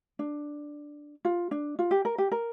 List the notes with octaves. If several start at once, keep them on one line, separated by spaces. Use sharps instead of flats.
D4
F4
D4
F4
G4
A#4
G4
A#4